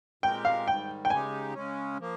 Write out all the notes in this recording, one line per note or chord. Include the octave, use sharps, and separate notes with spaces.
A#2 G#3 C4 G4 A#4 G5
F5
G#2 D#3 G3 G5
G5
C#3 G#3 D#4 G4 G#5
C#3 G#3 C#4
F3 A#3